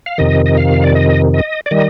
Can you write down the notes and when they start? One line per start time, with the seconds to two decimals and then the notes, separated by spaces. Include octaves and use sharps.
0.06 F5
0.18 F2 C3 D#3 D#5
0.46 D#5
0.57 F5
0.84 D5
0.95 D#5
1.34 D#5
1.66 D5
1.71 D#3 G3 D#5